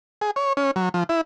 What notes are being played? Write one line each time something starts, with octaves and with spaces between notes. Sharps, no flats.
G#4
C#5
C#4
F#3
F3
E4